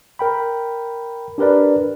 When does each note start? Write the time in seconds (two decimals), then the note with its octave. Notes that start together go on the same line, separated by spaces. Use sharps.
0.19 A#4 G5 B5
1.38 D4 G4 A#4 B4 D5